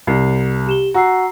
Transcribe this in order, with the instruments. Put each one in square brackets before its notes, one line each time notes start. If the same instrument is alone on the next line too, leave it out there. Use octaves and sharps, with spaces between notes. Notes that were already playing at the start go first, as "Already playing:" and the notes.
[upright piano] C2 [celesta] C7
[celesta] G4 E7 G7
[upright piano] F#4 [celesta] A#5 E6 C7